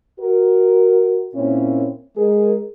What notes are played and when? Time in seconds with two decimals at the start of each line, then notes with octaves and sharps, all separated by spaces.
0.20 F#4 A#4
1.34 A#2 A#3 C4 C#4 E4 C#5
2.17 G#3 G#4 A#4